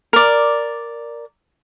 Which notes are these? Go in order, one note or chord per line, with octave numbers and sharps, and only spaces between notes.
A#4 D5